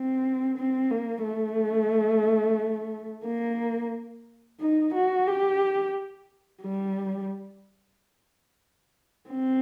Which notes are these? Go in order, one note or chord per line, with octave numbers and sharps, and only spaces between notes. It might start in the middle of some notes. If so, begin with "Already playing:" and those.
Already playing: C4
C4
A#3
A3
A#3
D#4
F#4
G4
G3
C4